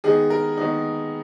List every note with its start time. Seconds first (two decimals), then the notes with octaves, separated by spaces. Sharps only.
0.04 D#3 G#3 B3 D#4 G#4
0.30 A#4
0.57 D#3 G#3 B3 D#4